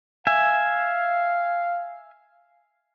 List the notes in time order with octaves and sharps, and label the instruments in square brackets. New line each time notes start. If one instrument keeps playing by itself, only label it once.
[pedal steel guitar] E5 G#5 [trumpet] F5